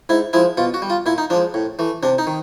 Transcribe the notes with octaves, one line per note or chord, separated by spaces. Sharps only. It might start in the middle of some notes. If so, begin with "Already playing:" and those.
G#2 E4
F3 G#3 E4
B2 F4
F#4
G3
F4
A#2 E4
D#4
F3 G#3 D4
A2
E3 A3
C3 D4
D#4
D#3